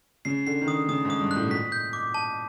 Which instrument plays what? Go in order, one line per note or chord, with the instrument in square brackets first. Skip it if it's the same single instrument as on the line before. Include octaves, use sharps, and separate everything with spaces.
[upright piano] C#3 [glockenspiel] C7
[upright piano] D3 [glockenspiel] C7
[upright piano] D#3
[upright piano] D3 [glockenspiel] D#6
[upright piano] C#3 [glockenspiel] D#6
[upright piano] G#2
[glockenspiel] D#6
[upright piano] G2
[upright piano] A2 [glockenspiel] F#6
[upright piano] B2
[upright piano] A#2 [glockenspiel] B6
[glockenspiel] G6
D6
A5